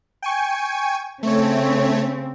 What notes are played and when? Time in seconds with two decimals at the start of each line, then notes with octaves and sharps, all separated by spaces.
0.22 G5 G#5 C#6
1.23 C#3 A3 C4 C#5